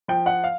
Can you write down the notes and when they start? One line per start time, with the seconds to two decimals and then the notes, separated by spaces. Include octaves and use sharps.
0.08 F3 G5
0.26 F#5
0.44 F5